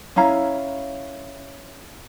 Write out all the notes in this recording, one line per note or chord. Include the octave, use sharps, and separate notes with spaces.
C#4 E4 F5 A#5